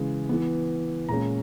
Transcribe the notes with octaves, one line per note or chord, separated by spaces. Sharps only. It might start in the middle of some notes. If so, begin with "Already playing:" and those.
Already playing: C#3 E3 G#3
E3 B3
A#2 G#3 C#4 A#5